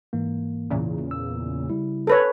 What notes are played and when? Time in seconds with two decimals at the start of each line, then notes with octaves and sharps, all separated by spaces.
0.13 G#2 E3 A#3
0.71 E2 A#2 C#3
1.11 E6
1.70 C#3 G3 E4
2.07 A4 B4 C#5